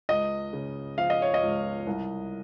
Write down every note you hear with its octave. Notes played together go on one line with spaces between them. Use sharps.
C#2 D#5
C#3
F3 F5
D#5
C#5
D#5
C#2
C2